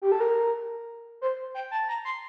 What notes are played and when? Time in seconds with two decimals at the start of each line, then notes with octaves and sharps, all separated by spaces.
0.02 G4
0.12 A4
0.20 A#4
1.21 C5
1.54 G5
1.71 A5
1.88 A#5
2.05 C6